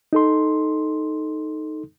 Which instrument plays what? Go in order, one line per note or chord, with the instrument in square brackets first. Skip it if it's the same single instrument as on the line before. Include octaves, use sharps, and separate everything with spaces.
[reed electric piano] D#4 A4 C6